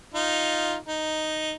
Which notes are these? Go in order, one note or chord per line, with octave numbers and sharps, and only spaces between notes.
D#4 F4
D#4